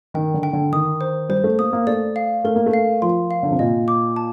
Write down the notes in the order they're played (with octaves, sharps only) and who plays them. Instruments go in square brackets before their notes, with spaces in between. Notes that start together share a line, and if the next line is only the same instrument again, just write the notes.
[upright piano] D#3 [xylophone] G5
[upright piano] D3
[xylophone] G5
[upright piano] D3
[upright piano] D#3 [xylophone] D#6
[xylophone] C5
[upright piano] G3 [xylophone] C5
[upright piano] A3
[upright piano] A#3 [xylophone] D#6
[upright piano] A#3
[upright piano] A3 [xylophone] D5
[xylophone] F5
[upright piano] A3 [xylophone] A#4
[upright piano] A#3
A3
[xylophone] F5
[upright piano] F3 [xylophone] C6
[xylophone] F5
[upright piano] D3
C3
[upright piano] A#2 [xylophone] D#5
[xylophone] D6
A5